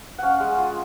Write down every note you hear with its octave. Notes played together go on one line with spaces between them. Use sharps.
C#4 F5 F#5
G#3
F4